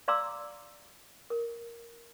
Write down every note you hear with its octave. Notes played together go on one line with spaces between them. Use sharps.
D5 F5 A#5 C6 D6 E6
A#4